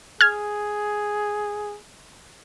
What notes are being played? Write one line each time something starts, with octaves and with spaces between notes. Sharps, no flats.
G#4 F6 G#6